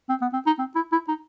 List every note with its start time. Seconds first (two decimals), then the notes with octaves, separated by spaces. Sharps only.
0.09 C4
0.22 B3
0.33 C4
0.47 D#4
0.59 C4
0.76 E4
0.92 E4
1.08 D#4